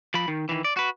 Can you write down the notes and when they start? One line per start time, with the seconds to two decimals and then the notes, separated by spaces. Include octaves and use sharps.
0.14 F3 B5
0.28 D#3
0.49 D#3 E3
0.64 D5
0.77 F#4 B4